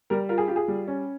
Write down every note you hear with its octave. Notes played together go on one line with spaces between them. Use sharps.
G3 A#4
F4 A#4
G#4
F4 G4
G#4
G3
C#4